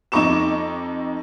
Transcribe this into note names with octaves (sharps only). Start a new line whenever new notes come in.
F2 D#4 A#5 C#6 D6 E7